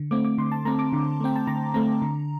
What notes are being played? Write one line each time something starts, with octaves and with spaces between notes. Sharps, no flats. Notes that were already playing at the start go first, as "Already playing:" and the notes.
Already playing: D3
A3 C4 D6
D6
D3 C6
A5
A3 C4 A#5
D6
D3
A3 C4 G5
A5
D3 A#5
A3 C4 A#5
D3